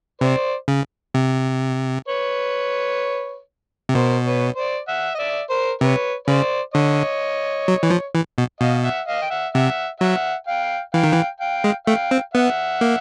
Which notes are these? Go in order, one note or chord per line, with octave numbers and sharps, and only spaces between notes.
C3 C5 D5
C#3
C3
B4 C#5
C3
B2 A#4 C5
B4 C#5
C5 D5
E5 F#5
D#5
D5 E5
A#4 C5
C3 B4 C#5
C#3 C5 D5
D3 C#5 D#5
F#3
E3
F3
E3
B2
B2 D#5 F5
E5 F#5
D#5 F5
G5
E5 F#5
C3 E5 F#5
F#3 E5 F#5
F5 G5
E3 F5 G5
D#3
E3
F5 G5
G#3
A3 F5 G5
C4
B3 E5 F#5
A#3